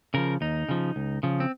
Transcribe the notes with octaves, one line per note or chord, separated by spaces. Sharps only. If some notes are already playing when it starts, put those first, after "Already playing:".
C#3 F3 A#4
D#2 D#4
C#3 F3
C#2
C#3 F3
C4